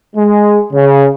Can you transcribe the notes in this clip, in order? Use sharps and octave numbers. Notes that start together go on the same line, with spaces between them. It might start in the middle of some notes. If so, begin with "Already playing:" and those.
G#3
C#3